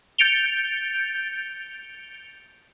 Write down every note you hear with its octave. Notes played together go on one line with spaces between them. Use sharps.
G6 A6 C#7 D7 F7 G7